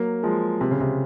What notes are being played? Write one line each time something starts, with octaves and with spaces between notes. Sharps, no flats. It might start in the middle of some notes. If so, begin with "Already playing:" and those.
Already playing: F#3 A#3
F3 G#3
C3
C#3
C3